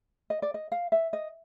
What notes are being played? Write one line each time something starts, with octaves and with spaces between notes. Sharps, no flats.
D#5
D5
D#5
F5
E5
D#5